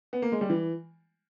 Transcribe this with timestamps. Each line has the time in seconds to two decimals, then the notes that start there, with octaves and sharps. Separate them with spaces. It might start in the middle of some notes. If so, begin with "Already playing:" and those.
0.13 B3
0.22 A#3
0.32 G#3
0.41 G3
0.49 E3